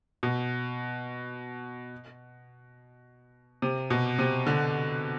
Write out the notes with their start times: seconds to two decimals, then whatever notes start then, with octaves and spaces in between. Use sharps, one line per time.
0.23 B2
3.62 C3
3.90 B2
4.19 C3
4.47 D3